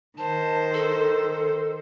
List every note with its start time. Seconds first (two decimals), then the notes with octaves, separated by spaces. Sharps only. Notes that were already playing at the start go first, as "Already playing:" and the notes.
0.17 D#3 C5 A5
0.74 A4